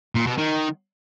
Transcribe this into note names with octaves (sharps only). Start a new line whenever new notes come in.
A#2
B2
D#3